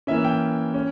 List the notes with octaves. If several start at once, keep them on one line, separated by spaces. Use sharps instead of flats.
E3 A#3 C#4 E5
G5
C#4